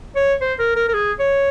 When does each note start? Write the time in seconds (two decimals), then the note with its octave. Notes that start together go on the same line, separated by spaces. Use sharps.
0.16 C#5
0.41 C5
0.59 A#4
0.76 A#4
0.89 A#4
0.94 G#4
1.19 C#5